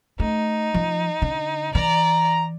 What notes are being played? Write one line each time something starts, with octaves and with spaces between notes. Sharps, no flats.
A3 D#4
F3
D3
E3 D5 A#5